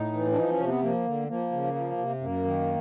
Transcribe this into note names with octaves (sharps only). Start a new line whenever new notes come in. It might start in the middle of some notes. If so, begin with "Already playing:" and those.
Already playing: A2 D#4
E3
D4
F3 D#4
C#4
C3
B3
F3 A#3
D3
F3 A#3
C#3
F3
C3
F#2 A#3
D#3